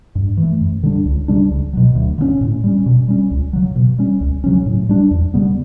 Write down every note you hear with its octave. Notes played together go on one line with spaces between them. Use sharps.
G2
E3
A3
F#2
D3 G3 D4
C#2
C#3 G3 D4
C#2
B2 F#3
D2
D3 A3 C#4
A2
G3 C#4
B2
G3 C#4
C#2
C#3 F#3
B2
G3 C#4
C#2
C#3 F#3 C#4
A2
G3 D4
E2
C#3 G3 B3